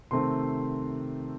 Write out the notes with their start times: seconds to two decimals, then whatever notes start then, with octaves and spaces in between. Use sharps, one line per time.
0.11 C3 D#3 A3 C4 C6